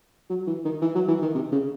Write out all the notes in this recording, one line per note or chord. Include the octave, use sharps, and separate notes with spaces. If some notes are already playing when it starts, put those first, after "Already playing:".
F#3
E3
D#3
E3
F#3
E3
D#3
C3
C#3